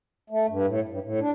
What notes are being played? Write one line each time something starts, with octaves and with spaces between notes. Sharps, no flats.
A3
G2
A2
G2
A2
D4